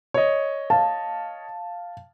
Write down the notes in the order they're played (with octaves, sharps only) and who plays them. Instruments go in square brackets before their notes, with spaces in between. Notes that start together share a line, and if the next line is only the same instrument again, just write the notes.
[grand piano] C#5 D#5
[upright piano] F5 A5